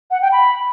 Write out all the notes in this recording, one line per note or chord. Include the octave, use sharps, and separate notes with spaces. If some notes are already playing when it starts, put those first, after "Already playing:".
F#5
G5
B5